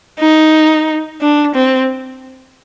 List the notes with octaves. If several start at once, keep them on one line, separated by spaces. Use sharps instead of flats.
D#4
D4
C4